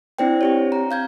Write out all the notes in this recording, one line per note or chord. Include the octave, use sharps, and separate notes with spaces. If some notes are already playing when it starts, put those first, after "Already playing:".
C4 D4 E4 C5 D5 G5
C4 G4 C#5
A#5
F5 G6 G#6